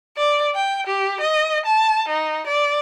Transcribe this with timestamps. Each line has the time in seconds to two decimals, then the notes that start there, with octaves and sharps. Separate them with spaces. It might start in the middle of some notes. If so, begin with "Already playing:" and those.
0.17 D5
0.55 G5
0.87 G4
1.21 D#5
1.66 A5
2.08 D#4
2.47 D5